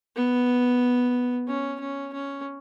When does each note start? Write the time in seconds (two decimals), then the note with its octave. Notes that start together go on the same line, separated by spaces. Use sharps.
0.16 B3
1.48 C#4
1.80 C#4
2.13 C#4